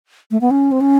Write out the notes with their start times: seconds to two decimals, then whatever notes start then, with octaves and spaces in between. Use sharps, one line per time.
0.31 A3
0.41 B3
0.51 C#4
0.72 C4
0.81 C#4